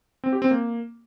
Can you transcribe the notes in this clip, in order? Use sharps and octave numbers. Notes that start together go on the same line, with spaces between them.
C4
G4
C4
A#3